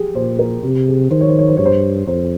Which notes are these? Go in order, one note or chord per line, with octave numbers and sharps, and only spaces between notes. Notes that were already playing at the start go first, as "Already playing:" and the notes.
Already playing: G4 G#4
A#2 C5
A#4
C3 G4
G#4
D#3 C5
C#5
C5
C#5
C5
G2 C#5
C5
F2 C5